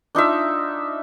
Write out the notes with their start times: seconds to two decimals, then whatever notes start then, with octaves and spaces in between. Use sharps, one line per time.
0.15 D4 D#4 F4 E5